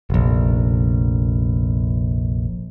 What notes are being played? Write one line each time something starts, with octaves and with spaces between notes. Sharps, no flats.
F1 A#1